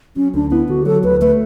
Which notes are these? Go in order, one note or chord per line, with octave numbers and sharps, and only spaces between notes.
F#3 C#4
D2 D4
B3 E4
D3 F#4
G4
F#3 A4
D2 B4
A3 B4